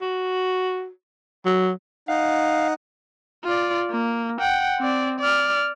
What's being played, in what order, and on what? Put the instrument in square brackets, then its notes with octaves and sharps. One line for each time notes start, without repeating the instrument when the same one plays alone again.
[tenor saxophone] F#4
F#3
[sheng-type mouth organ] D#4 F#5 [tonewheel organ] F5
[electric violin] F4 D5
A#3
F#5 G5
C4 D5
D5 F6